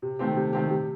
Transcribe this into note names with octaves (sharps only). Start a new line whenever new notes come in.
C3
D#3 A3 C4 G4
C3
D#3 A3 C4 G4
C3